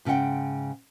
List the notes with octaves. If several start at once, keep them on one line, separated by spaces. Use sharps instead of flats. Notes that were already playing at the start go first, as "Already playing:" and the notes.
G#2 C#3 A4 F#5 G5